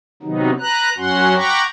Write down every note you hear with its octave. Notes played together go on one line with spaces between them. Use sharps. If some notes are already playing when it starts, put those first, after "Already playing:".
C3 D#3 F#3 B3 D#4
B4 A#5 F#6
F#2 F#3 C#4 F#4 F#5 C6
F#5 G5 A#5 B5 C#6 D6